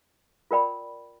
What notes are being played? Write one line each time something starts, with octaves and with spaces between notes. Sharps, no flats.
F4 A#4 D5 G5 B5